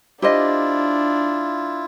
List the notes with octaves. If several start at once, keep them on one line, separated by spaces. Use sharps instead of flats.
D4 E4 F4 G4 C5 D#5